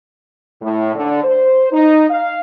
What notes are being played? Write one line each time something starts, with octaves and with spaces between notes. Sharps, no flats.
A2
D3
C5
D#4
F5